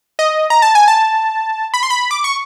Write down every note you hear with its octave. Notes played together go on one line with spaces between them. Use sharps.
D#5
A#5
A5
G#5
A5
B5
C6
B5
D6
C#6